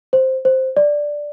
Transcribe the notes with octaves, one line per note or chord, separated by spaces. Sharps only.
C5
C5
D5